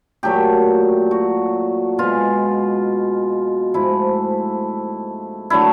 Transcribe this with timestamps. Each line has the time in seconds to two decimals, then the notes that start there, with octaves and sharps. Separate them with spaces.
0.23 A#2 F#3 A3 G4
1.11 F#4
1.99 B2 G#3 F4
3.74 G#2 F3 A3 E4
5.50 D3 F#3 A3 E4